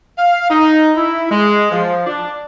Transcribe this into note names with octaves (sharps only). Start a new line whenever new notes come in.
F5
D#4
E4
G#3
F3
D4